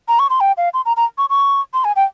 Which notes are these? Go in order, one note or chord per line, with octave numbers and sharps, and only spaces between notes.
A#5
C#6
C6
G5
F5
C6
A#5
A#5
C#6
C#6
C6
G#5
G5